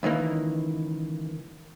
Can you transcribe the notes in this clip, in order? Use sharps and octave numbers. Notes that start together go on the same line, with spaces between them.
C#2 D#3 E3 A#3